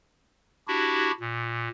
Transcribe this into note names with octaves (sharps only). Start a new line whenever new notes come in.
D4 E4 F#4 G4
A#2